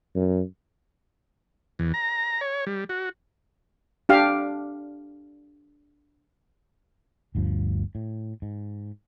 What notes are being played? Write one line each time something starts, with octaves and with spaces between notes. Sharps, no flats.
F#2
E2
A#5
C#5
G3
F#4
D4 G4 F5
G1 D2 G2 F3
A2
G#2